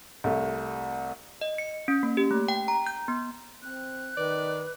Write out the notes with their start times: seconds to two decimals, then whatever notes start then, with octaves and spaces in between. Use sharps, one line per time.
0.24 C2 A3
1.41 D#5
1.58 C#7
1.88 C#4
2.03 A#3
2.17 G4
2.31 A3
2.48 G5
2.68 A#5
2.87 G6
3.08 B3
3.63 C4 F#6
4.17 D#3 B4 D5